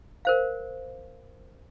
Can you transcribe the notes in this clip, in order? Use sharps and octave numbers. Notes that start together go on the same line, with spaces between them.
A#4 C5 F5